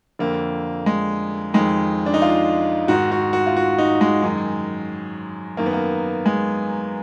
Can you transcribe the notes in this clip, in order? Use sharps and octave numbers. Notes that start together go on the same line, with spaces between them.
F2 D3 A#3
G#3
F2 D#3 G#3
D4
D#4
F4
G#2 D#3 F#4
F#4
F#4
F4
F#4
D#4
G#3
F#2 D#3
F#2 D#3 A#3
B3
A#3
G#3